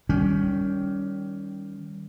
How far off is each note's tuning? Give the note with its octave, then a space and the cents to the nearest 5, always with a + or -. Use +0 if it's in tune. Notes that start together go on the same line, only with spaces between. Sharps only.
D#3 +0 G3 -5 C#4 +15